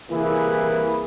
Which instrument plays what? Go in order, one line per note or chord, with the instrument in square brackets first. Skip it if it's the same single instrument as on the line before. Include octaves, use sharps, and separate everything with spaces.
[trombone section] C2 E3 A#3 E4 G#4 B4